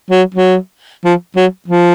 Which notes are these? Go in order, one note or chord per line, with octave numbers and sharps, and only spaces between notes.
F#3
F#3
F3
F#3
F3